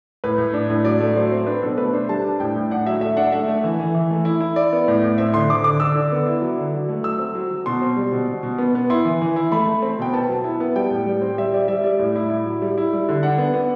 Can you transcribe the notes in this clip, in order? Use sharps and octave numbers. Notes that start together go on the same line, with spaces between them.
A2 B4
A2
D4
A2
F#3 D5
A3
F#3 C5
C4
D4 B4
B2 A4
A3 B4
D4 C5
G3 A5
D4
A2 G5
A2
D4 F#5
F#3 E5
A3 E5
D4 F#5
A3 E5
A3
E3
E3
E3
A3
E4
E4
E4 D5
B3
A2
A2
C4 E5
D3 C6
D3 D6
D3 D6
D3 E6
D3
B3
E4
F#3
D3
F#3
A3
F#3 E6
C4
F#3
F#3
B2 C6
C4
G3
B2
B2
B2
B3
B3
E4 C6
E3
E3
E4
A3 B5
A3
C4
B2 G5
B3 A5
F#3
E4
B3
G3 G5
A2
G3
C4
G3 E5
G3 D5
G3 E5
G3 D5
A2
E4
E4
F#3
G3
E4
G3
D3
D4 F#5
B3
B3